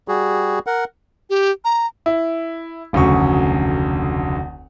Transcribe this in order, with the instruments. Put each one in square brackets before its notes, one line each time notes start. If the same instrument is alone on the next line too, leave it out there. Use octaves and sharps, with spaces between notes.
[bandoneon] G3 F#4 G#4
A#4 F#5
[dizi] G4
A#5
[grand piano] E4
F1 D2 C#3 F#3 C#6